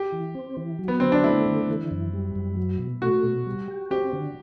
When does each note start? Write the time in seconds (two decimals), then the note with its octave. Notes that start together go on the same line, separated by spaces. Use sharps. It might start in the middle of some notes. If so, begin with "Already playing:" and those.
Already playing: G4
0.12 E3
0.35 C4
0.57 E3
0.79 F#3
0.88 B3
1.00 D3 C4
1.12 D4
1.24 A3 E4
1.46 D3
1.68 E3
1.91 F#2
2.13 G3
2.36 F#2
2.57 F#3
2.79 B2
3.02 A3 F#4
3.24 B2
3.46 G3
3.68 G4
3.90 C4 G4
4.13 D3